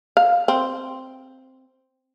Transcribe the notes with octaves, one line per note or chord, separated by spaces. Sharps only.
F5
C4